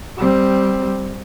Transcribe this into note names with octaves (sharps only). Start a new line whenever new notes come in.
G3 C4